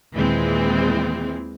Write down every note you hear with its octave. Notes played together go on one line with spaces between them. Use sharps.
D#2 A#2 E3 G#3 C4